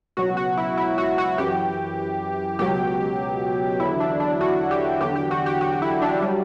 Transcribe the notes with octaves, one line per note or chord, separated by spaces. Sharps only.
C#2 B2 F#3 F#4
F#4
E4
E4
F#4
F#4
F#2 E3 G4
C#2 B2 F#3 G4
E2 D3 F#3 E4
D4
D4
F#4
G4
E2 D3 F#3 G4
G4
F#4
G4
F#4
E4
D4
F#3 G3